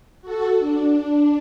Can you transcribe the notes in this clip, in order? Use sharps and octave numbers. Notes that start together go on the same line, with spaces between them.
F#4 A4
D4